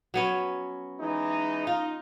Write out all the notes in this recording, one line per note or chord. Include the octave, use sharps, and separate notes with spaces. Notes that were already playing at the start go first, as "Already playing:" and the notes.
F#3 B3 C#4
E3 G#3 D#4
D#4 F4